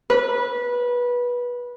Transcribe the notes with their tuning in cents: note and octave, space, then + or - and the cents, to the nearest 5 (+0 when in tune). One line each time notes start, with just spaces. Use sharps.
B4 -20